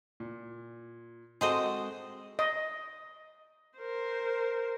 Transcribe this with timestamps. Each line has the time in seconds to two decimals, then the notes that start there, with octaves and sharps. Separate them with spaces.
0.20 A#2
1.41 G#3 C4 F#4 A4 C5 D#5
2.39 D#5
3.79 A#4 C5